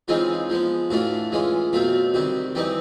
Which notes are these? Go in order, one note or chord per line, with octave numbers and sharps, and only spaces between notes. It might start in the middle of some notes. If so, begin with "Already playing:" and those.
C#3 E3 G#3 C4 D#4 F4
F3 G#3 B3
A2 E3 A3 D4 F4 F#4
E3 G#3 C#4 F4
B2 F#3 A3 C4 F4
C3 D#3 G3 F#4
E3 G3 C4 D#4 G4